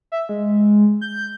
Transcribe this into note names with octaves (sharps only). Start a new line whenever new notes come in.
E5
G#3
G6